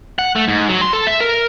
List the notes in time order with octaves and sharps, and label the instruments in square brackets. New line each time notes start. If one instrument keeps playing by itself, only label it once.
[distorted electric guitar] F#5
A3
G#2
F#3
C6
A4
E5
A#4